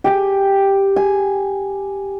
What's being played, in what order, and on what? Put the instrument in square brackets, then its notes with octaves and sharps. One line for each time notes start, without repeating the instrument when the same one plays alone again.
[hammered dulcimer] G4 G5 G#5
G#5